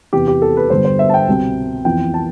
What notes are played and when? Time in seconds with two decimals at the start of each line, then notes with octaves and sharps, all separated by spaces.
0.13 E2 C3 E3 G4
0.28 G4
0.42 A4
0.57 B4
0.70 G2 D3 G3 B3 C5
0.85 C5
0.99 E5
1.09 A5
1.14 G5
1.28 C2 B2 G3 C4
1.85 F2 E3 B3 G5
2.14 A5